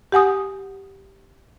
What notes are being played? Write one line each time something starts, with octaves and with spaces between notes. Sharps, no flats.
G4 F#5 G#5 D#6